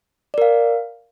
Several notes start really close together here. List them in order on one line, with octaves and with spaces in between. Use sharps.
D5 A#4 F5